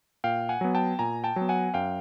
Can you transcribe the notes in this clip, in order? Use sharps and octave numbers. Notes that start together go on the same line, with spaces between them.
A#2 F5 G5
F#5 G#5
F#3 B3
G5 A5
A#2 G#5 A#5
G5 A5
F#3 B3
F#5 G#5
F#2 F5 G5